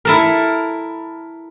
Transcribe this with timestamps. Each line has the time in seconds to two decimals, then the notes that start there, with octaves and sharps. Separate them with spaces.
0.05 E4 A4 A#4